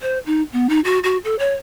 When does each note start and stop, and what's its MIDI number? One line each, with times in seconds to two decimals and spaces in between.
0.02 0.18 72
0.26 0.42 63
0.53 0.67 59
0.69 0.80 63
0.85 0.99 66
1.04 1.18 66
1.24 1.35 69
1.39 1.53 73